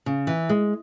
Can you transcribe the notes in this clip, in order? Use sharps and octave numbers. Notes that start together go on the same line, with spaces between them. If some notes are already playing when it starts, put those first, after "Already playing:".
C#3
E3
G#3